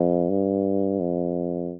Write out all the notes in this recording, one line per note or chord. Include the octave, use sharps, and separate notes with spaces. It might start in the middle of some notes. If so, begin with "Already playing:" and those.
Already playing: F2
G2
F2